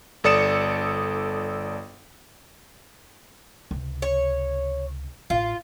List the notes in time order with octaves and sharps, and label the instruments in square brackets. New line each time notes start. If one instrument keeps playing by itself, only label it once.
[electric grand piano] G1 A4 D5 D#6 C#7 E7
[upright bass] C#2 C3
[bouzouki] C#5
[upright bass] A1 [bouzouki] F4